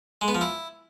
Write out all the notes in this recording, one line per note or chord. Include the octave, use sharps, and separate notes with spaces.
G#3
B3
F3
E4